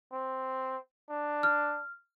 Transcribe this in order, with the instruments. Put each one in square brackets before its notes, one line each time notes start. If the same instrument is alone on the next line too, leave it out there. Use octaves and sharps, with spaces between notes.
[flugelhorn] C4
D4
[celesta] F6